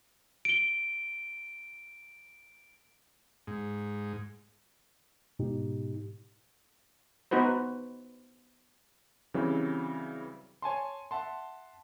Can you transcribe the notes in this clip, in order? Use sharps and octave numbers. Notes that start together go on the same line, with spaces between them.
D7 G7
G#2
G#2 B2 D#4 G4
B3 D#4 F#4 B4 C5
C#3 E3 F#3 G3 C4
C#5 G#5 A5 C6
E5 F#5 A5 C6